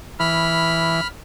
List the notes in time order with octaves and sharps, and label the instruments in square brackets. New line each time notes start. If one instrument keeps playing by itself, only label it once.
[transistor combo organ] E3 [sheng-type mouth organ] B5 F6